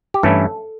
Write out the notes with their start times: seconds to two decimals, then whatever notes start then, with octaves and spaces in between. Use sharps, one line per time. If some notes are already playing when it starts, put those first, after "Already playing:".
0.14 G4
0.23 G2 E3 A3 C#4 E4 A4